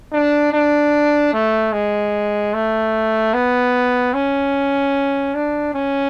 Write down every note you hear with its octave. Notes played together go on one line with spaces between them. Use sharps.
D4
D4
A3
G#3
A3
B3
C#4
D4
C#4